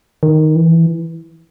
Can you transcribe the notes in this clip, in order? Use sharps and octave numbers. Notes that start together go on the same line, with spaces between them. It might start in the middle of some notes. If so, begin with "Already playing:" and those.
D#3
E3